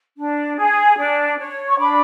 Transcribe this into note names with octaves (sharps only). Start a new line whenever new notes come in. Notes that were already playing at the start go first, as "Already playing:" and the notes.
D4
G#4
D4
C#5
C#6
D4 B5 D6